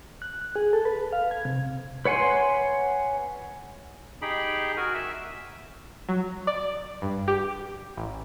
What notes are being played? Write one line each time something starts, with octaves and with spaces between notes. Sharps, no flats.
F#6
F#6
G#4
A4
B4
F5
G#6
C3
B4 C#5 F#5 G#5 C6
D#4 G4 G#4 G5 B5
F#4 A#4 G#5
E5
F#3
D5
G2
G4
A1